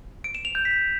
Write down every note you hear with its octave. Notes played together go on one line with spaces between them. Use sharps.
D7
E7
F7
G6
B6